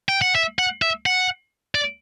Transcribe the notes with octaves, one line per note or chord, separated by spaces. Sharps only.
G5
F#5
E5
F#5
E5
F#5
D5